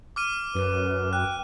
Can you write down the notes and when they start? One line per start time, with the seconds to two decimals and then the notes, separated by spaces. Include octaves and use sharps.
0.16 D6 F6 D#7
0.55 F#2 B4
1.13 G5 F#6